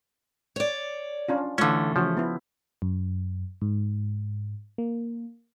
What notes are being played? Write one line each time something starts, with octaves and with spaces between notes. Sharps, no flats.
C#5 D5
C#4 D4 F4
D3 E3 A3 C#4 F4
C#3 F3 F#4 C#5
B3 E4
F#2
G#2
A#3